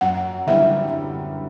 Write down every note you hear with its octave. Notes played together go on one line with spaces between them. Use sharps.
F#2 F#5
D3 G3 B3 E4 E5